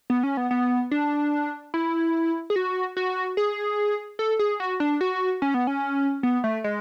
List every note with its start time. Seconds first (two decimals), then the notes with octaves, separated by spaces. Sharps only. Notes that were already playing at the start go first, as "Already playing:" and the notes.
0.10 B3
0.23 C#4
0.37 B3
0.51 B3
0.91 D4
1.74 E4
2.50 G#4
2.56 F#4
2.97 F#4
3.37 G#4
4.19 A4
4.39 G#4
4.60 F#4
4.80 D4
5.01 F#4
5.42 C#4
5.54 B3
5.67 C#4
6.23 B3
6.44 A3
6.64 G#3